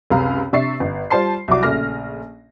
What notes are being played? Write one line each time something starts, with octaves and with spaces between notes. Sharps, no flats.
C#2 F#2 C3 F5 A#5
C3 D4 E5 C#6 A6 C7
G1
G3 F4 C5 A5 C6 C7
C2 F#3 G3 F#4 D6
A#1 C#3 A3 F6 A#6